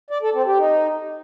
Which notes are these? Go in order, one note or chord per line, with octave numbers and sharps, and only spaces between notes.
D5
A4
C4
G4
D#4